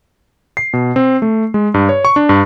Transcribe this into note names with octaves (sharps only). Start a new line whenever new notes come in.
C7
B2
C4
A3
G#3
G2
C#5
C#6
D4
G2